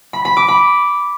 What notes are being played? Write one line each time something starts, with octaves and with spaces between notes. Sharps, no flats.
B5
B5
D6
B5